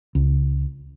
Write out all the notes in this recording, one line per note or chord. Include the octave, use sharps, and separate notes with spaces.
C#2